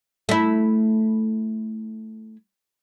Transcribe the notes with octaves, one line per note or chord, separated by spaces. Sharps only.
A3 E4